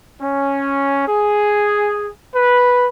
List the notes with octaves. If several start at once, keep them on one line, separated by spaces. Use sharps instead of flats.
C#4
G#4
B4